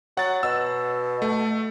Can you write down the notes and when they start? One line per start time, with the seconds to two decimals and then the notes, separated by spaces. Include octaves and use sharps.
0.17 F#3 F#5 A6
0.43 B2 E6
1.22 A3